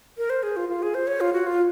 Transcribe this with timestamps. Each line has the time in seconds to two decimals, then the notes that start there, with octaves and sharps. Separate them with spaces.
0.18 A#4
0.30 C5
0.43 G#4
0.56 F4
0.69 F4
0.82 G#4
0.94 C5
1.07 C#5
1.21 F4
1.33 F#4
1.47 F4